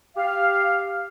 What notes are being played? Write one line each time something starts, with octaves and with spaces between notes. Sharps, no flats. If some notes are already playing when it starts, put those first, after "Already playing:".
G4 F5